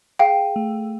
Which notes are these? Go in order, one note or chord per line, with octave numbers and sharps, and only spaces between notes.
G#4 F5 G5
A3